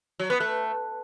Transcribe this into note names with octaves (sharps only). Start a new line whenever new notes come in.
F#3
B3
A3